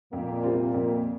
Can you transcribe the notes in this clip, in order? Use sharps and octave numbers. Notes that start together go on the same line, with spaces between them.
F2 A#2 A#3
C3 G3 C4 F4
F2